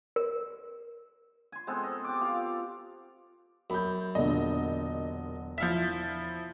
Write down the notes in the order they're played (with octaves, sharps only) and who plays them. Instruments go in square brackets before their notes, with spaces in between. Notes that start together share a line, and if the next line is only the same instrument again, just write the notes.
[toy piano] A#4
[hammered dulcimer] G#5 C6
G#3 B3 C4 A4
D#5
G4 D6
F4 F5
[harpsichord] F#2 [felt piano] B5 G6
[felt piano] E1 A#2 D3 [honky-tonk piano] D#5
[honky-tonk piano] F3 E4 B6 [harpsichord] E5 F5